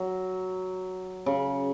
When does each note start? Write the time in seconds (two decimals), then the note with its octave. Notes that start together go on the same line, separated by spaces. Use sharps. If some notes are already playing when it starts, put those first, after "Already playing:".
Already playing: F#3
1.26 C#3